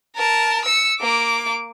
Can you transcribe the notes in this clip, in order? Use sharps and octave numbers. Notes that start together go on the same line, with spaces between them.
A#4 A5
E6 C#7
A#3 D6